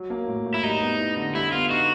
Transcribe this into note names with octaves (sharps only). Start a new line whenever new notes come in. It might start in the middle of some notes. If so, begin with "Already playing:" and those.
Already playing: F#3
A#3
A2
A2
E4
G3 D#4
B3
E4
D3
G3 E4
B3 F4
D#4 F#4